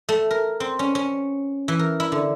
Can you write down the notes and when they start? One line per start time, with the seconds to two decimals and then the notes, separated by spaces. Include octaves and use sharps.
0.09 A3
0.31 A#4
0.60 C4
0.79 C#4
0.95 C#4
1.68 E3
1.79 A#4
2.00 E4
2.12 D3